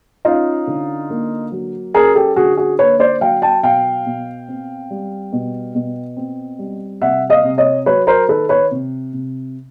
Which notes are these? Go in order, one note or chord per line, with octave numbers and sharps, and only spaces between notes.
C#4 D#4 F4
D3
A#3
F#3
C#4 G#4 A#4
G4 A4
D3 F#4 G#4
F#4 G#4
A#3 B4 C#5
C5 D5
F#3 F5 G5
G5 A5
B2 F5 G5
B2
C4
G3
B2
B2
C4
G3
C3 E5 F#5
D#5 F5
C3
C#5 D#5
F#3 B4 C#5
A#4 C5
D#3 A4 B4
B4 C#5
C3
C3